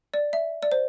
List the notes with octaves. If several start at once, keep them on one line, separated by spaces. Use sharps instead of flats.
D5
E5
D5
C5